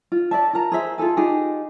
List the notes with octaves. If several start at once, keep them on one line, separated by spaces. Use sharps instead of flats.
F4
D5 E5 A5
F4 A#4 A5 A#5
G#4 C5 E5 A#5
F4 G#4 A4 G#5
D#4 F4 G4 G#4